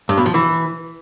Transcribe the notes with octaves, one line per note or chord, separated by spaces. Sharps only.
G2
B2
F3
E3